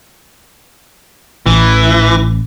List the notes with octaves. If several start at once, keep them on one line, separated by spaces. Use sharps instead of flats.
A1 E3